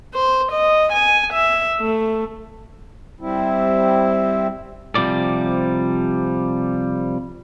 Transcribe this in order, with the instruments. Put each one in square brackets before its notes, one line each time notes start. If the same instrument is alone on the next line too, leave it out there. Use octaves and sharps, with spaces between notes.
[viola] C5
D#5
G#5
E5
A3
[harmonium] G3 C4 E4
[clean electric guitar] C3 F3 G3 D5